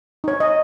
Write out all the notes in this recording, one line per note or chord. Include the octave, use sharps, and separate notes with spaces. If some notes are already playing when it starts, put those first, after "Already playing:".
D#4 C#5
D#5